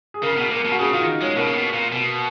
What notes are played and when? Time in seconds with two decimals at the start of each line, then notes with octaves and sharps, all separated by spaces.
0.14 G#4
0.23 C#3 A#4
0.37 B2
0.50 A#2 A#4
0.65 B2
0.72 F#4
0.79 C#3 G#4
0.93 D#3 F4
1.08 D#4
1.21 G#3 C#4
1.35 B2 A#3
1.47 C#3
1.55 B2
1.73 A#2
1.92 B2